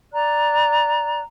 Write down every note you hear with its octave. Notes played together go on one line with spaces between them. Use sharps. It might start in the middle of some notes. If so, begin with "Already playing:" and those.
D5 A#5 F#6